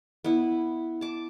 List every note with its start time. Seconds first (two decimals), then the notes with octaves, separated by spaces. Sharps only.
0.24 B3 E4
1.01 A5 D6